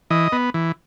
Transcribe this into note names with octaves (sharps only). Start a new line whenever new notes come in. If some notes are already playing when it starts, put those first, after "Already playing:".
E3 D#5
B3
E3